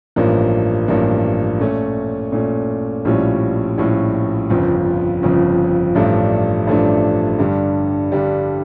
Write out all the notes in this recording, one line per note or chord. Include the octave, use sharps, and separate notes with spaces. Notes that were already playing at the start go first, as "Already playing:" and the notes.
A1 G2 F3 A#3
A1 G2 F3 A#3
A#2 A3 C#4
A#2 A3 C#4
A#1 A2 G3 C#4 F4
A#1 A2 G3 C#4 F4
G1 F2 C#3 F3
G1 F2 C#3 F3
A1 G2 F3 A3 D4
A1 G2 F3 A3 D4
G2 D3 G3
G2 D3 G3